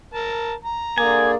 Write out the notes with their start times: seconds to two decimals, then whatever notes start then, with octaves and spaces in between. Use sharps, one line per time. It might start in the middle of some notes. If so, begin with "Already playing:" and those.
0.14 A#4 A5
0.65 A#5
0.98 D3 A#3 G#4 D5 G#5